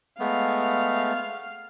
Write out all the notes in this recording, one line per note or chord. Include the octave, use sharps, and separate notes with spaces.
G#3 A3 B3 F5